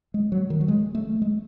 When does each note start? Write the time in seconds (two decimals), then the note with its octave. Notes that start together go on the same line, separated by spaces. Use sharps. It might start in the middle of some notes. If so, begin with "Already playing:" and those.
0.14 G#3
0.32 F#3
0.50 D#3
0.61 F#3
0.68 G#3
0.95 A3
1.22 G#3